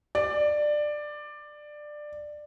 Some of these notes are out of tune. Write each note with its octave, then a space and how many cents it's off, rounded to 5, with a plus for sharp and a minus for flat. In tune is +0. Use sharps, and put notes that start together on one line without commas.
D5 +15